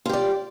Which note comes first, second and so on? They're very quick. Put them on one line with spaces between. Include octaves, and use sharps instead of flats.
F4 G4 D5